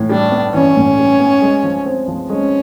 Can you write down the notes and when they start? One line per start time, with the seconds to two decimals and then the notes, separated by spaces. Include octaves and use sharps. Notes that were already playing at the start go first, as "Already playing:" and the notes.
Already playing: A2 E3
0.09 G3 D4
0.32 B3
0.54 E3 C#4
0.76 A2
0.98 G3
1.20 B3
1.42 G#3
1.64 F3
1.86 C4
2.08 F3
2.30 G#3 C#4